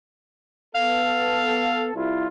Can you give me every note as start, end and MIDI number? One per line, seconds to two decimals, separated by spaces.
0.75 1.93 59
0.75 1.93 69
0.75 1.84 77
1.94 2.26 36
1.94 2.26 64
1.94 2.26 65